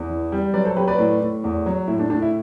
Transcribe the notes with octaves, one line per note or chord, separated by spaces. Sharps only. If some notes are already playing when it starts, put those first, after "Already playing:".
Already playing: E2
E3
G3
F#3 B4 D5
A4 C5
F#3 G4 B4
B4 D5
A2
A2
E2
F#3
A2 E4
D4
A2 D4
E4